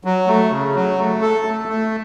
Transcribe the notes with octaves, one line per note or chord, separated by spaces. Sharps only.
F#3
A3
C#3
F#3
A3
A4
A3
A3